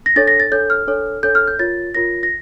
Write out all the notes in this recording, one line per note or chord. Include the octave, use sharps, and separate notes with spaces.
A#6
D4 A4 C#5 A6
A#6
A6
D4 A4 C#5 G6
F6
D4 A4 C#5
D4 A4 C#5 G6
F6
G6
F4 A#4 C#5 A6
F4 A#4 C#5 A#6
A#6